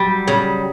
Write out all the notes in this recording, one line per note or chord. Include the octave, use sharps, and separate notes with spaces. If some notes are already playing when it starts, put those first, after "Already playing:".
Already playing: F#3 G3
C#3